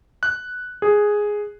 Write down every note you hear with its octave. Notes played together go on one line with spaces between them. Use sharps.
F#6
G#4